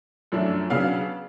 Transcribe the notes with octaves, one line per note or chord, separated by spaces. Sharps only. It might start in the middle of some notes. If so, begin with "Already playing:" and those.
F#2 F3 A3 D4
C#3 F#3 B3 D4 F5